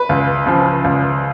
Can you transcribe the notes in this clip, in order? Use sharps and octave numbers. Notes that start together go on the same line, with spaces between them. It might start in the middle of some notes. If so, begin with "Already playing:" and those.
Already playing: B4
C#2
C#3 F3
C#2